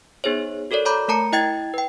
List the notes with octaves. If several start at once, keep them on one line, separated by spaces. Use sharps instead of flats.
B3 D#4 G#4 C5 C#5
F#4 A4 A#4 C#5 D5
C#5 A#5 B5 D6 G6
A3 A#4 A5 A#5 C#7
E4 D#5 G5 G#6 A6
B4 G5